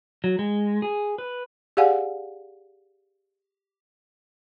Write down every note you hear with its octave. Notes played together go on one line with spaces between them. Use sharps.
F#3
G#3
G#4
B4
G4 G#4 D5 F5 F#5 G#5